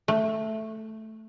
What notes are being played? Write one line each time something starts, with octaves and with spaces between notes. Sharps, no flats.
A3